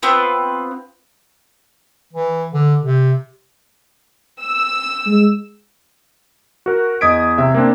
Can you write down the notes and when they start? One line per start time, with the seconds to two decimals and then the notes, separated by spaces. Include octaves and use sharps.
0.02 B3 C4 F4 B4
2.13 E3
2.53 D3
2.82 C3
4.42 E6
5.06 G#3
6.66 F#4 A#4
7.01 E2 D#5 D#6 G#6 B6 D7
7.38 C3 E5
7.54 A#3 C4 D4